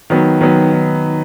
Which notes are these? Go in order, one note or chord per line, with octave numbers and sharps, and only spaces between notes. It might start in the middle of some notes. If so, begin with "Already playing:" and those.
D#3 F#3 B3
D#3 F#3 B3
D#3